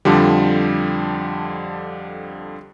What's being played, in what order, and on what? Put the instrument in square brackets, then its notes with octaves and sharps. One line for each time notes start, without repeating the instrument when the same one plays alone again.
[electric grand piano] F2 D3 F3 G3